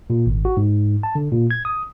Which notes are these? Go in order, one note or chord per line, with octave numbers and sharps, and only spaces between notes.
A#2
G#1
F#4
G#2
A5
D3
A#2
G#6
D#6